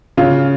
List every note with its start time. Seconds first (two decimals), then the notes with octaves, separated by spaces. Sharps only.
0.17 C#3 F4